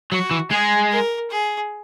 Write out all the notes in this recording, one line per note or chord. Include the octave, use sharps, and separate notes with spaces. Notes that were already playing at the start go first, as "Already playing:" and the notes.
F#3 F#4
E3
G#3 G#4
A#4
G#4